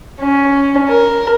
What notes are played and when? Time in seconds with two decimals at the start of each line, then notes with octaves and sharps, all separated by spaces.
0.21 C#4
0.89 A#4